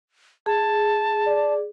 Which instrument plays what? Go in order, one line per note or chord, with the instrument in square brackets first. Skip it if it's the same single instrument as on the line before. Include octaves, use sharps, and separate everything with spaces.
[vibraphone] G#4 [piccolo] A5
[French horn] D5